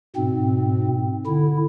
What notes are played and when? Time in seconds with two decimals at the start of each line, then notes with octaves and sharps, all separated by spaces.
0.16 G#2 B2 C4
1.26 D3 E4